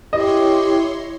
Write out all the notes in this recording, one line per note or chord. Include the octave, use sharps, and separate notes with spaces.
E4 G4 C#5 D#5 C6